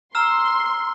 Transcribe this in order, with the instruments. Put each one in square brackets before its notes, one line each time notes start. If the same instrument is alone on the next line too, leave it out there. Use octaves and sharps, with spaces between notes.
[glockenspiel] A#5 E6 F6 [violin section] C6